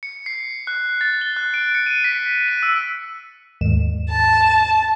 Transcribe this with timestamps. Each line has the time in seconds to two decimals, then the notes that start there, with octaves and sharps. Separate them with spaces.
0.03 C#7
0.26 C7
0.67 F#6
1.01 A6
1.21 G7
1.36 F#6
1.54 D7
1.75 C#7
1.86 D#7
2.04 B6
2.48 D#7
2.63 E6
3.61 D#2 G#2 E7
4.10 A5